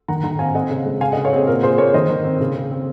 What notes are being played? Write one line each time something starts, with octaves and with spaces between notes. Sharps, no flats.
D#3 F#5 A#5
D#3 F#5 A#5
C4 F5 G#5
C4 D#5 F#5
C#3
G#3
C#3 F5 G#5
D#5 F#5
C#3
C#5 F5
C4 G#4
A#2 A#4
A#2 G#4 C5
A#3 A#4 C#5
D#3 C5 D#5
D#3
C4
C#3
C#3
C4